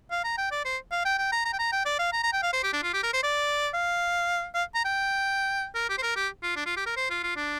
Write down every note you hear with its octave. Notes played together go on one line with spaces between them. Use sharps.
F5
A#5
G5
D5
C5
F5
G5
G5
A#5
A#5
G5
A#5
G5
D5
F5
A#5
A#5
G5
F5
C5
G4
D4
F4
G4
A#4
C5
D5
F5
F5
A#5
G5
A#4
G4
C5
A#4
G4
F4
D4
F4
G4
A#4
C5
F4
F4
D4